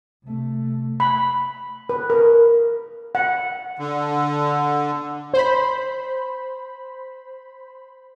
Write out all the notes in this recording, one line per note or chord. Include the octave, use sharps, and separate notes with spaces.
C3 A3
B5
B4
A#4
F#5
D3
C5 B5